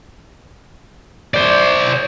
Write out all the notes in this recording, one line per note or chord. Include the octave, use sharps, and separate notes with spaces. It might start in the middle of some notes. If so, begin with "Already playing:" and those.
C5 D5